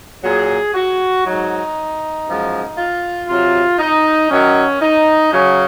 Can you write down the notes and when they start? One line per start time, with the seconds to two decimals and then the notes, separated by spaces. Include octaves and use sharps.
0.23 A#2 F#3 G#4
0.74 F#4
1.25 G#2 F#3 D#4
2.27 F#2 F3 G#3
2.77 F4
3.28 C3 F#3 F4
3.79 D#4
4.29 F#2 D#3 F#3 C#4
4.80 D#4
5.31 F#2 C#3 F#3 C#4